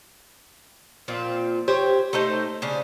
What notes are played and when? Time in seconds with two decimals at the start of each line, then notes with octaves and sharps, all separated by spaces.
1.08 A#2 F3 C4 F4
1.68 G4 C5 C#5
2.13 A3 D#4 A4 C5
2.62 C#3 F3 C#4 D4